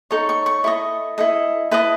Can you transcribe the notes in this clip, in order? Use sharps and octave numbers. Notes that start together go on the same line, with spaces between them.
D#4 A4 C#5 C#6
C#6
C#6
E4 A4 D#5 C#6
E4 A4 D#5
E4 B4 D#5 A5